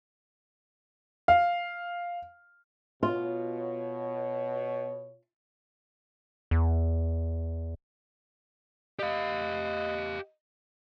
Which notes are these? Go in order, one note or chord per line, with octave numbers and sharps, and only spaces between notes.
F5
B2 F4 C#5
E2
G4 D#5 F5